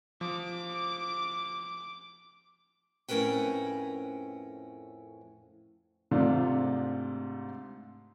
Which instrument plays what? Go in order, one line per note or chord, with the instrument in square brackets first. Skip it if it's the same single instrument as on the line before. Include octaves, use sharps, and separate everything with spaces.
[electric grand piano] F3 [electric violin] D6
[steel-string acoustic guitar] F2 A2 C#4 A#4 B4 G5
[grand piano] G#2 C3 A3 D4 F4